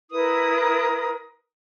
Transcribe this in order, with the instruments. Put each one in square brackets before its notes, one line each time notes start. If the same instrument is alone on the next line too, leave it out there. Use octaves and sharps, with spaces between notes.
[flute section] E4 A#4 B4 D#6